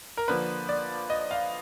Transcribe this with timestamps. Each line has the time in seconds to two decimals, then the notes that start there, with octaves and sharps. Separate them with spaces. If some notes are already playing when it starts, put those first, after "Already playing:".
0.17 A#4
0.28 D3 F3 A#3 B4
0.69 D5
1.10 D#5
1.31 F5